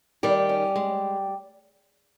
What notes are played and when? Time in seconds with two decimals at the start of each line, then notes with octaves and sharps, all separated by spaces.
0.23 D#3 G3 G4
0.49 C#4
0.76 G#3